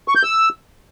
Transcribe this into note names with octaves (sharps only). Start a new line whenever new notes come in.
C#6
G6
E6